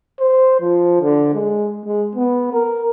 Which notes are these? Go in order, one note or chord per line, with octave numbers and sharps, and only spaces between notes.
C5
F3
D3
G#3
G#3
B3
A#4